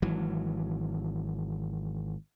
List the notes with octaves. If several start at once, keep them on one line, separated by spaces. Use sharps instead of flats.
G#1 E3 F#3